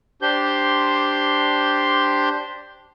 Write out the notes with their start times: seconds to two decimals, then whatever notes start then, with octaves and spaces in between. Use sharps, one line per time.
0.22 D4 G4 C5 C6 G6